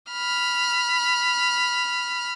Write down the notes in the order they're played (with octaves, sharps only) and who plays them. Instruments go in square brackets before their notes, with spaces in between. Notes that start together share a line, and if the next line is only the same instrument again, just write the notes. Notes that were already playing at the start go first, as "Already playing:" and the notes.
[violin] B5 F6